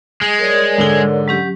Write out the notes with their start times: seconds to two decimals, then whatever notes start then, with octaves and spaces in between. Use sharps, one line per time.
0.21 G#3
0.39 A#4 C#5 D5
0.78 G#2 D3 G7
1.28 F#3 C#4 G4